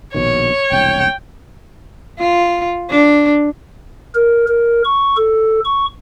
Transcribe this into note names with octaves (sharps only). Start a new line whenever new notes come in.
A#1 B2 D#3 C#5
E1 C2 G5
F4
D4
A#4
A#4
C#6
A4
C#6